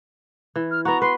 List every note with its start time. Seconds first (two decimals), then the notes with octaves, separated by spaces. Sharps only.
0.56 E3
0.71 F6
0.85 B3 F#4 A#5
1.02 B4 C6